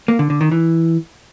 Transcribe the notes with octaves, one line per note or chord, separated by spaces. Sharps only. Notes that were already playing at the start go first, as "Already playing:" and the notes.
A#3
D3
D3
D#3
E3